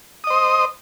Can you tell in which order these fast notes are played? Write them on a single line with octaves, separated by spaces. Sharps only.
D#6 D#5 C5